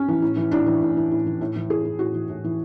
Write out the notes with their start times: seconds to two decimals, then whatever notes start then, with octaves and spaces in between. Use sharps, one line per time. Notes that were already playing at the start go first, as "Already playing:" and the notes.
Already playing: C#4
0.08 E3
0.22 A2
0.37 E3
0.51 A2 D4
0.66 E3
0.82 A2
0.97 E3
1.11 A2
1.26 E3
1.41 A2
1.56 E3
1.70 A2 G#4
1.85 E3
1.99 A2 F#4
2.14 E3
2.30 A2
2.44 E3